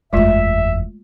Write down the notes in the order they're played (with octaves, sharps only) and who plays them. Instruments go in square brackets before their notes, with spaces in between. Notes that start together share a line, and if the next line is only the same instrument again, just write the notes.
[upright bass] F#1 E2 [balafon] G#3 A3 F4 [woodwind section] E5